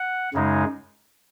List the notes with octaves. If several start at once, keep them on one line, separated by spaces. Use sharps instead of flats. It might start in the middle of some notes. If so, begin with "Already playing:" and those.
Already playing: F#5
F#2 C#3 G#3 D#4